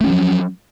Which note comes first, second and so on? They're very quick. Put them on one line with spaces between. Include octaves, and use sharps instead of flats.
A3 C#4 F3 F#3